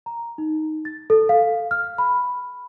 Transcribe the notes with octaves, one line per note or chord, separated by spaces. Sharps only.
A#5
D#4
A6
A4
F5
F6
B5